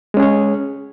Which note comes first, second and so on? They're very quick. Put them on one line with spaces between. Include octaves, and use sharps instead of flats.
G#3 C#4 G#4 C#5